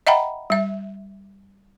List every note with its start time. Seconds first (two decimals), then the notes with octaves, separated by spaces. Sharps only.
0.07 D#5 E5 F#5 G5 A#5 B5
0.50 G3 E5